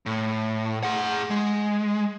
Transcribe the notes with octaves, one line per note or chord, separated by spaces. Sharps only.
A2
G#4 F#5
G#3